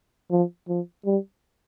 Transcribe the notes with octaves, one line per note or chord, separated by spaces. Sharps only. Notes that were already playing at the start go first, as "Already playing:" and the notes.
F3
F3
G3